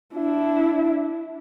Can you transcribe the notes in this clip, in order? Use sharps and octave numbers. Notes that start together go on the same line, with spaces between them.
D4 E4